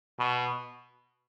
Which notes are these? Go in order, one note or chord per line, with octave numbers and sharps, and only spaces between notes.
B2